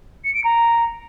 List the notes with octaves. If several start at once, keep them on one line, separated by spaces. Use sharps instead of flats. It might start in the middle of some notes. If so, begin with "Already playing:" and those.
C#7
D7
A#5